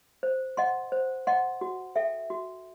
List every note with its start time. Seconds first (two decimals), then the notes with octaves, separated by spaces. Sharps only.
0.23 C5
0.57 D#5 F#5 C6
0.92 C5
1.27 D#5 F#5 C6
1.61 F#4
1.95 A4 E5 G5
2.30 F#4